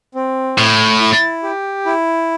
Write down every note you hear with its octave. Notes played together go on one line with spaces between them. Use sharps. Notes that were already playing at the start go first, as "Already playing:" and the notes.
C4
A2 E4
E4
G4
E4